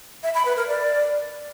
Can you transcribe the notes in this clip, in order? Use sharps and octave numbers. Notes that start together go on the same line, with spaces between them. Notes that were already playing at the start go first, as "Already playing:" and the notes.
E5
B5
B4
A#4
D5